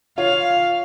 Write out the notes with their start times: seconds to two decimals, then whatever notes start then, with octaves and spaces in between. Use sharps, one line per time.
0.18 F4 C#5 F5